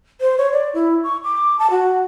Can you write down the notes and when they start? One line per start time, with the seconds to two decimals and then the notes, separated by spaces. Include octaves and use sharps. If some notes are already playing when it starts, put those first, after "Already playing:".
0.21 C5
0.38 C#5
0.52 D5
0.74 E4
1.04 C#6
1.24 D6
1.59 A5
1.71 F#4